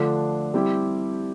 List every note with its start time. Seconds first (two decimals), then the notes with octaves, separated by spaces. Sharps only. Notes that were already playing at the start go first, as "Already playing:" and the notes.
Already playing: D3 F3 A3 D4
0.54 G3 C4 E4 G4